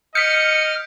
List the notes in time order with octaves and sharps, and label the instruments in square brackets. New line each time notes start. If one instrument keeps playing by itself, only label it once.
[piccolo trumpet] D#5 [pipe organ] F6 [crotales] G6 B6 D7 [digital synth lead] C#7